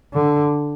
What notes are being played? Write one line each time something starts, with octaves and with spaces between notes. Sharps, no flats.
D3